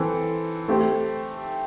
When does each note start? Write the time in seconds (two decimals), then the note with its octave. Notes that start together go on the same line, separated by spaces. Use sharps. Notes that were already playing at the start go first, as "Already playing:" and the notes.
Already playing: E3 C4 A4 C5
0.68 A3 C4 G4 C5